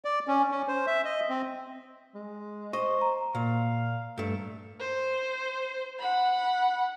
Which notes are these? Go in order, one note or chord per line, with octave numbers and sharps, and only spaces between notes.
D5
C#4
C#4
C5
E5
D#5
C4
G#3
C5 D#5 C#6
A#5
A#2 F5
G2 A3
C5
F#5 B5